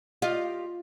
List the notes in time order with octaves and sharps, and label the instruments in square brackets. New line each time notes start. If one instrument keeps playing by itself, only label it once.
[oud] F4 [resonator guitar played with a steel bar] G4 D#5 F5